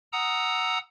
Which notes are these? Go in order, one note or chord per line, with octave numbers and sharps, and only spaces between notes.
F#5 A#5 D#6 E6